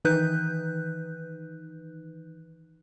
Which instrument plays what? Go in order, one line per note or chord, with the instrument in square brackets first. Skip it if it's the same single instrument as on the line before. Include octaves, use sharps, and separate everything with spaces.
[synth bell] D#3 E3 D#4 B4 F#6 G6